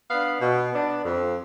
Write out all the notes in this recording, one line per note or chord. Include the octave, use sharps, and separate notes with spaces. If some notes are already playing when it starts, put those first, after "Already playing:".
B3 D4 F5
B2
B3 D4
F2